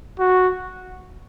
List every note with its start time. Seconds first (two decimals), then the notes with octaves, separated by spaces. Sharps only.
0.19 F#4